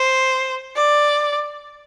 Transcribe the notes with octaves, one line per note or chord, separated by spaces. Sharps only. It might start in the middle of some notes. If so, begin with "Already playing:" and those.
Already playing: C5
D5